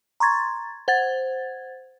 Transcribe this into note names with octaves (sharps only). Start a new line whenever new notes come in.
A#5 C6 C#6 G#6 A6
C5 F#5 G#6 A6